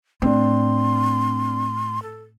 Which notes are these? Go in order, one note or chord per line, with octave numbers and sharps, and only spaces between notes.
A2 C4 D4 C6
A4